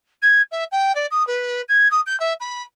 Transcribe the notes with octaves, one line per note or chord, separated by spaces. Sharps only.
G#6
E5
G5
D5
D#6
B4
G#6
D#6
G6
E5
B5